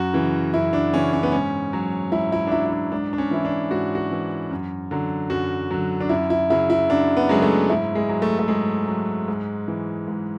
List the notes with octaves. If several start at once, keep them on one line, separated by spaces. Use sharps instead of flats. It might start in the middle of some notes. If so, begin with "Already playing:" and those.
Already playing: F#2 F#4
C#3 E3
F#2 E4
D4
C#3 E3 C#4
C#4
B3
G#2 C#4
F#3
G#2 E4
E4
D4
F#3 E4
E4
D4
G#2 D4
D4
C#4
E3 E4
D4
G#2 F#4
F#4
E3
F#2
D3 F#3
F#2 F#4
D3 F#3
D4
F#2 E4
E4
C#3 F#3 E4
E4
F#2 D4
B3
C#3 F#3 G#3
A3
G#2 E4
G#3
F#3
A3
A3
G#2 G#3
F#3
G#2
E3
G#2